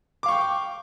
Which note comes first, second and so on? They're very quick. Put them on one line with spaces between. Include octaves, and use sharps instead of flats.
D6 F5 C#6 G5